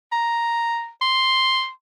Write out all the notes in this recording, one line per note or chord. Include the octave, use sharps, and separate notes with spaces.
A#5
C6